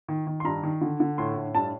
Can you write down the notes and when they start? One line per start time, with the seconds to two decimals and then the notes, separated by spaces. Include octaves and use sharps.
0.08 D#3
0.27 D#3
0.40 C6
0.44 G2 A#5
0.63 D#3
0.81 D3
1.00 D3
1.18 A2 C6
1.36 A2
1.54 G2 A5